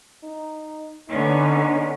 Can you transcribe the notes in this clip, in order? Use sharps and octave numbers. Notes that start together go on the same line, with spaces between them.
D#4
D3 B3 C#4 D#4